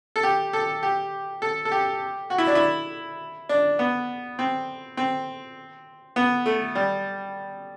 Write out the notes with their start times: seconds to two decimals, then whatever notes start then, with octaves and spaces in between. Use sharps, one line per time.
0.16 A4
0.23 G4
0.53 A4
0.83 G4
1.42 A4
1.65 A4
1.72 G4
2.30 F#4
2.38 E4
2.47 D4
2.55 E4
3.49 D4
3.79 B3
4.39 C4
4.97 C4
6.16 B3
6.46 A3
6.75 G3